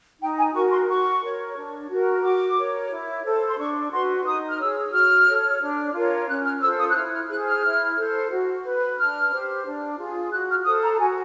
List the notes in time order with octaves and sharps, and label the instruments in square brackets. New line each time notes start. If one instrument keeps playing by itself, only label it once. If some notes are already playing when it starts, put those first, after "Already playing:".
[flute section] D#4 G5
G#5
F#4 A#4 C#6
C6
F#4 C#6
A#4 C#5
D4
F#4 A#4
F#4 D6
A#4 C#5
E4
A4 C5
C6
D4 C#6
F#4 B4 C6
D#4 D#6
F6
G#4 C#5 E6
F#4 F6
A4 C#5
D4
F4 A#4 C#5
C#4 F#6
F6
F4 A4 C5 E6
D#6
F#6
E4 F6
F6
G#4 F#6
C5
F6
E4
A4 C5
F#4
B4
D4 F6
G4 C5
D4
F4 G#4
F#4 F#6
F6
A4 C5 D#6
A#5
F#4 G#5